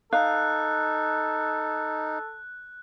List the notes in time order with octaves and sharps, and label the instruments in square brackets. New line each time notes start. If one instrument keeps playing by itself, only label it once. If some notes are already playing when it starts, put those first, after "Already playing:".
[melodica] D#4 [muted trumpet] A4 [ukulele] F5 [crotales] F#6